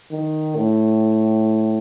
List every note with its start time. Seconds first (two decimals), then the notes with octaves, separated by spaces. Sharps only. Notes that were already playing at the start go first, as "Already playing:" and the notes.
0.11 D#3
0.56 A2